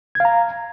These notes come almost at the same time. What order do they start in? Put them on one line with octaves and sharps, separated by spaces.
G#6 F5 A#5